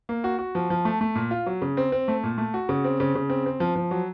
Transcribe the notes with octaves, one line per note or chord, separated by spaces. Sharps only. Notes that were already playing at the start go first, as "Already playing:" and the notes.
A#3
F#4
F#4
F3
F3
A3
A3
A#2
F4
F#3
C#3
C4
C4
A3
A#2
A3
F#4
C#3
C4
C#3
C#3
C4
C4
F3
F3
F#3